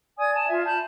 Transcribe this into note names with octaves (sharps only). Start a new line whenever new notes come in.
D5 G#5 D#6 G#6
G#5 A5
F4 E5
A5 B5 G6